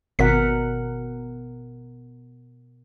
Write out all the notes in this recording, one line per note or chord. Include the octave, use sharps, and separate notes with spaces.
G#1 B2 A#4 F#5 B6